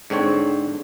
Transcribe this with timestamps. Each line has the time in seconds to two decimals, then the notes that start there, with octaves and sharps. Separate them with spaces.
0.10 G#2 D3 C4 C#5